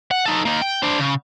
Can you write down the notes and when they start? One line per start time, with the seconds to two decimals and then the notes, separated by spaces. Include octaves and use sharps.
0.11 F#5
0.26 D#4 A4
0.45 A#3 D#4
0.62 G5
0.83 D4 C5
1.00 C#3